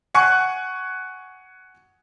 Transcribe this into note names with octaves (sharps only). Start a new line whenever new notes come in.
F#5 G#5 C#6 F#6 C#7